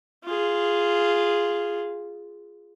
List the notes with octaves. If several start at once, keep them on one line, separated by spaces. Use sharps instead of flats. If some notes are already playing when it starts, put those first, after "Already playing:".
F4 G#4